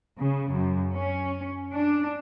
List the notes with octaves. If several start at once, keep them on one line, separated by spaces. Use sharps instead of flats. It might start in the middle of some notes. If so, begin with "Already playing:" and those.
C#3
F#2
C#4
D4